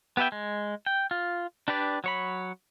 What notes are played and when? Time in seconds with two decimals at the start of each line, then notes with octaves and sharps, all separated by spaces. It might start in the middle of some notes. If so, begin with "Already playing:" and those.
0.17 B3 G4 B4 E5 G5
0.32 G#3
0.86 G5
1.11 F4
1.68 D4 G4 B4 D5
2.04 F#3 C#5 B5